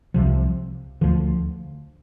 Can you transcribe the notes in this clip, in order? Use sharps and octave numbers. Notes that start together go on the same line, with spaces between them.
C2 C3 F3
D2 D3 F3